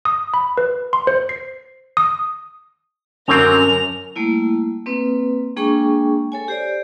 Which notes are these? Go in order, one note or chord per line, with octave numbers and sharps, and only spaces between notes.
D#6
B5
B4
C6
C5
C7
D#6
F#2 D3 F#3 C4 A#4 F7
G3 A3 A#3 E4
A#3 C4 B4
G#3 A#3 D4 G#4 G5 C#6
A4 C#5 G#5
G4 C5 D5